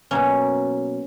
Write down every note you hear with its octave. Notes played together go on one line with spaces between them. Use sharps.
B2 F#3 A#3 C#4